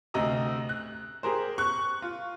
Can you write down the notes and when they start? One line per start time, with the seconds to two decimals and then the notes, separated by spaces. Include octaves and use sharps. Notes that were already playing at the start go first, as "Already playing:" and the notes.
0.14 D2 C3 D#5 A#5 D#6
0.69 F#6
1.23 G4 G#4 A#4 C5
1.58 C#6 F#6
2.02 F4